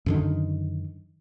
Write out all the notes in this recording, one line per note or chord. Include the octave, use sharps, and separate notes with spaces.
F#2 D3 D#3